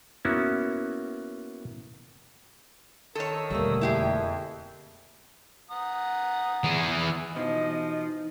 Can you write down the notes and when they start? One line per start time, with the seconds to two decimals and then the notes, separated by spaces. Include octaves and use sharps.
0.25 A#3 B3 C#4 E4 F#4
3.15 D#3 A4 C#5 D#6 E6
3.50 E1 D3 G3 A3 A#3
3.81 F2 E4 G4 G#4
5.71 F#5 A#5 D#6
6.64 E3 G#4
7.36 B2 E3 F3 D#4 D#5